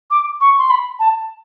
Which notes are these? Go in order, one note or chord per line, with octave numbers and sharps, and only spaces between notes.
D6
C#6
C6
B5
A5